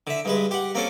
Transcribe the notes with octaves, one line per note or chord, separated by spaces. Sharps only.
D3 E5
G2 G#3 B4
G4 F#5
A#3 C4 C#4 A4